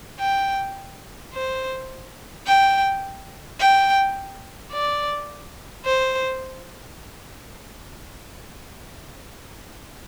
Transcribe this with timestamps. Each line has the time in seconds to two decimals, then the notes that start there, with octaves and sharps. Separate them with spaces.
0.20 G5
1.34 C5
2.47 G5
3.60 G5
4.72 D5
5.86 C5